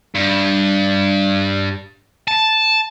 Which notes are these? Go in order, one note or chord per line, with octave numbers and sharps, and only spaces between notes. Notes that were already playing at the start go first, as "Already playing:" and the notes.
G2
A5